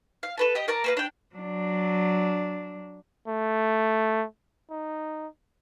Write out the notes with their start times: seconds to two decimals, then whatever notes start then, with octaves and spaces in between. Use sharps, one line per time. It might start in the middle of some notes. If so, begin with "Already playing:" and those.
0.23 F5
0.38 A4 B4 A5
0.55 G4 D#5
0.68 A#4 D5 A5 A#5
0.84 A#3 B4 F5
0.97 D4 G5
1.35 F#3 D4
3.28 A3
4.70 D#4